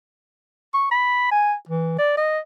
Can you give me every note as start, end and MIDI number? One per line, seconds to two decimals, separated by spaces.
0.74 0.91 85
0.91 1.31 83
1.31 1.54 80
1.69 1.99 52
1.99 2.15 74
2.17 2.39 75